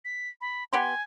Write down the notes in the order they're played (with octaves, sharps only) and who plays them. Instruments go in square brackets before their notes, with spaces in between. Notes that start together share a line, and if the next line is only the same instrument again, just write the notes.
[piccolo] B6
B5
[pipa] B3 G4 C6 [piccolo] G#5